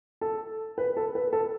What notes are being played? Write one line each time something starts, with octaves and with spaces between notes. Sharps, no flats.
A4
B4
A4
B4
A4